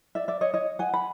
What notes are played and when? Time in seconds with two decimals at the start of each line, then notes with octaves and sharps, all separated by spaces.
0.15 D5 E5
0.28 D5 E5
0.41 C#5 D#5
0.54 C#5 D#5
0.79 F#5 G#5
0.94 B5